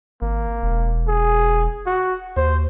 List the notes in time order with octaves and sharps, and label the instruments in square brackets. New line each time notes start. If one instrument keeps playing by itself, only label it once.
[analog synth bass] G#1 [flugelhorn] A#3
[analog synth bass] E1
[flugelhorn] G#4
F#4
[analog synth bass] D#2 [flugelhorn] C5